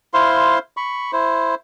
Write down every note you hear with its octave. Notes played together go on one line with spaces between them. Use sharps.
E4 C5 F5 C6
B5 C#6
E4 C5